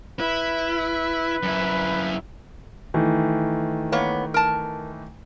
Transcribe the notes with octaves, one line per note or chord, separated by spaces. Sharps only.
E4 B4
F#2 E4
D#3 E3 A3
A#3 B3 C#5
A#4 A5